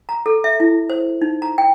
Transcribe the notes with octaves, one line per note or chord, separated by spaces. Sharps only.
A#5
A4
E5
E4
C5
D#4
A#5
G5